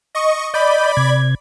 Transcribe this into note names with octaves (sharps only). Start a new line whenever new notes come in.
D#5 C#6
D5 D#5 B5 G6
C3 G#6